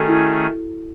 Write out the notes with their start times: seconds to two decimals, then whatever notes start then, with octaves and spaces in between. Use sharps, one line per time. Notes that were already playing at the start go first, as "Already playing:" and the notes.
Already playing: D#3 A3 C#4 F#4 G#4 A4
0.08 E4